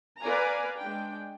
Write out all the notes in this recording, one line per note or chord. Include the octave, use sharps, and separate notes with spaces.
B4 D5 F5 G#5 A#5
G#3 D4 G5